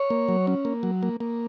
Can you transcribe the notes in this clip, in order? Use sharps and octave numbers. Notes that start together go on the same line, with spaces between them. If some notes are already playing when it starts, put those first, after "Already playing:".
Already playing: C#5
A#3
F#3
C#4
A#3
F#3
A#3
A#3